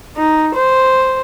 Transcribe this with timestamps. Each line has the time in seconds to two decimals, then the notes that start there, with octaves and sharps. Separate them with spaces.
0.17 D#4
0.55 C5